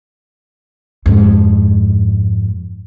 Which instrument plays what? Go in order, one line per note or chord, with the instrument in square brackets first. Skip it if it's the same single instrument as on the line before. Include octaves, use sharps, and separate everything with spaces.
[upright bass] F2 G#2